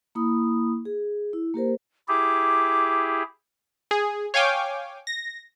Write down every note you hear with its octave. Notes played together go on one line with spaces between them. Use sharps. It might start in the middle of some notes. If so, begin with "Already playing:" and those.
A#3 E4 B5 D#6
G#4
E4
A#3 G4 A#4 C5
E4 G4 G#4 D6
G#4
C#5 F5 G5 G#5 D6
A#6